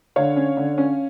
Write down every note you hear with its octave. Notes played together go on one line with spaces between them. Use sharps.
D3 C#5 F5
C#4
D3
C#4